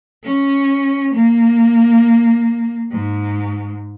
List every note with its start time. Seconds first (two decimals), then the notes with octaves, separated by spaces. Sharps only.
0.24 C#4
1.14 A#3
2.91 G#2